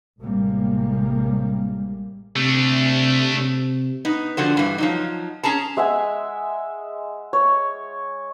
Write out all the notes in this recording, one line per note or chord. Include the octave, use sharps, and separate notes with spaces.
A1 A2 C3 G3 G#3 A#3
C3 A3 D4
C3
B3 D#4
D3 F3 F#4 C5
G2 E3
F3 F#3 D#4
C#4 G#4 A5 A#5
G#3 E5 F#5 G#5
C#5